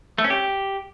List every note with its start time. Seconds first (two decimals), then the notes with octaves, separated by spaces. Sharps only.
0.18 A3
0.24 C#4
0.30 G4